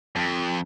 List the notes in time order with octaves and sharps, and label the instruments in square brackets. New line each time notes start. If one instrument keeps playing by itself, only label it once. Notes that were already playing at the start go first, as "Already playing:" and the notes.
[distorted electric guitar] F2